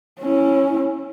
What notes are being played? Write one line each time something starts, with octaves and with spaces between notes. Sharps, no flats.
C#4 E4